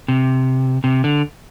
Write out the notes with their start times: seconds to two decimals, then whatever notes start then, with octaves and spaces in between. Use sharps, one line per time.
0.08 C3
0.84 C3
1.04 D3